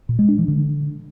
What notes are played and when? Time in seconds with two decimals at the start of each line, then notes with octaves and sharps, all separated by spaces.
0.09 A#2
0.19 G#3
0.28 D4
0.38 E3
0.48 D3